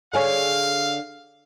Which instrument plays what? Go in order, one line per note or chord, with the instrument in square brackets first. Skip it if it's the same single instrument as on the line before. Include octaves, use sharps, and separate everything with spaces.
[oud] D3 G#4 C#5 [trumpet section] F5